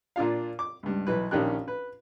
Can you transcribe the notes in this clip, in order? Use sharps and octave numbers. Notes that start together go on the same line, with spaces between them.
A#2 D4 F4 F5
D6
C#2 G2
B1 E3 B4
A#1 D#3 C#4 G4 F#6
B4